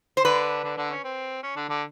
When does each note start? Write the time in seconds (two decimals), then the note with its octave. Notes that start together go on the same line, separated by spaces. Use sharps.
0.17 C5
0.24 D3 D4 B4
0.64 D3 D4
0.77 D3 D4
0.90 C#4
1.04 C4
1.43 C#4
1.56 D3 D4
1.69 D3 D4